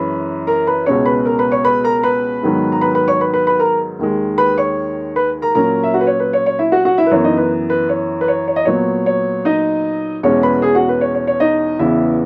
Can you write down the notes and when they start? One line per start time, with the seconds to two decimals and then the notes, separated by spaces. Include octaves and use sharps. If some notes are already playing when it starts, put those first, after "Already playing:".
Already playing: F#2 E3 G#3 C#4 B4 B5
0.47 A#4 A#5
0.67 B4 B5
0.86 C#2 B2 G#3 C#4 C#5 C#6
1.06 B4 B5
1.25 A#4 A#5
1.39 B4 B5
1.52 C#5 C#6
1.64 B4 B5
1.84 A#4 A#5
2.03 B4 B5
2.43 G#2 D#3 F#3 B3
2.72 A#5
2.81 B4 B5
2.95 B4 B5
3.08 C#5 C#6
3.21 B4 B5
3.34 B4 B5
3.47 B4 B5
3.59 A#4 A#5
3.99 D#2 D#3 G#3
4.38 B4 B5
4.58 C#5 C#6
5.16 B4 B5
5.42 A#4 A#5
5.55 A#2 F#3 C#4 A#4 A#5
5.83 E5
5.94 F#4 F#5
6.01 B4
6.07 C#5
6.20 B4
6.33 C#5
6.46 C#5
6.59 E4 E5
6.72 F#4 F#5
6.85 F#4 F#5
6.98 E4 E5
7.07 B4
7.11 F#2 E3 B3 C#5
7.24 D#4 D#5
7.37 B4
7.70 B4
7.89 C#5
8.21 B4
8.28 C#5
8.48 C#5
8.56 D#5
8.65 A#2 F#3 B3 C#5
9.06 C#5
9.45 D#4 D#5
10.23 E2 B2 G#3 C#4 C#5 C#6
10.43 B4 B5
10.62 G#4 G#5
10.75 F#4 F#5
10.89 B4
11.01 C#5
11.14 C#5
11.27 C#5
11.40 D#4 D#5
11.79 E2 C#3 E3 B3 E4 E5